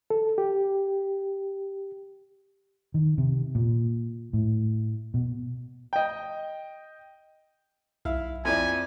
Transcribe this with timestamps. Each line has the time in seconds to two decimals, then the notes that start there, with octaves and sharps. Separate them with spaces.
0.10 A4
0.38 G4
2.94 D#3
3.18 C3
3.55 A#2
4.33 A2
5.14 B2
5.93 D#5 G5
8.05 B1 E4 F5
8.45 F2 E4 D5 G#5